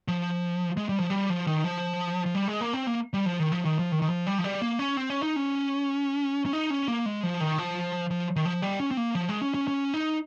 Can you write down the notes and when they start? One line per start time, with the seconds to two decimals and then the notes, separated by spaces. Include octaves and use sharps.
0.08 F3
0.77 G#3
0.89 G3
1.00 F3
1.10 G3
1.30 F3
1.47 D#3
1.64 F3
2.26 F3
2.35 G3
2.48 G#3
2.61 A#3
2.73 C4
2.87 A#3
3.13 G3
3.26 F3
3.39 D#3
3.52 F3
3.65 D#3
3.79 F3
3.92 D#3
4.02 D#3
4.09 F3
4.27 G3
4.38 F3
4.44 G3
4.62 A#3
4.79 C#4
4.97 C4
5.10 C#4
5.23 D#4
5.36 C#4
6.46 C#4
6.53 D#4
6.70 C#4
6.88 A#3
7.06 G#3
7.23 F3
7.40 D#3
7.58 F3
8.11 F3
8.36 D#3
8.45 F3
8.62 G3
8.80 C#4
8.91 C4
8.97 A#3
9.15 F3
9.29 G#3
9.42 C#4
9.54 C#4
9.68 C#4
9.94 D#4